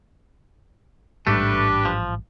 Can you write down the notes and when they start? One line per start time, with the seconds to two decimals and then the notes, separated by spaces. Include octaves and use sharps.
1.27 A1 G#2 G3 A3 D4 G4 B4
1.85 F3